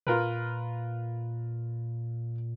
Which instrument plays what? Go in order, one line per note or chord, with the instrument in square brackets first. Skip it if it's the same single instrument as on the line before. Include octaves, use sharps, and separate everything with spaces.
[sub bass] A#2 [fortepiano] F4 A#4 B4